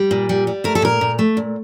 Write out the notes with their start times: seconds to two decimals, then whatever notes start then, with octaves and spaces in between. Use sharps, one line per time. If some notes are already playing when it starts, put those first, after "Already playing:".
Already playing: G3
0.11 A#2
0.29 G3
0.47 G3
0.64 A3 A#4
0.75 A4
0.82 A#2 A#4
1.01 A#2
1.19 A3
1.37 A#2